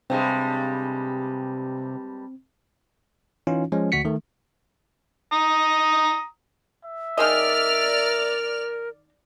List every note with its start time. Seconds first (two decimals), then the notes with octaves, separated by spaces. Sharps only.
0.10 G2 C3 G3 G#3 C4
3.47 E3 C#4 D#4 F4
3.72 F3 G#3 C#4
3.92 D2 F#4 B6 C#7
4.05 D#3 A3
5.32 A#5 D#6
6.85 E5
7.17 D#3 G#4 A#4 D5 D#5 F6